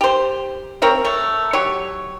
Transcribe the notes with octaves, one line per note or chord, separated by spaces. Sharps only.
G4 C5
C4 A#4 C#5 F5
A3 C#5
F#3 G4 C#5